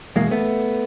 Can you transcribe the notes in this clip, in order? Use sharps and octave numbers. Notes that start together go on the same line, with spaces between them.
E2 B2 G#3 A#3
A3 B3